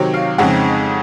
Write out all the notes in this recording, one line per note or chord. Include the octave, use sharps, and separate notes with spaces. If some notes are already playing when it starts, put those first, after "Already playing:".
Already playing: C3 D#3 F#3 C4 C#5
F5
F2 C#3 G#3 C4 D#4 F#5